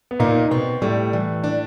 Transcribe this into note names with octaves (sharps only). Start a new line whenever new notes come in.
B3
A#2 A#3 D#4
B2 B3 C4
A2 G3 A3
E3
D4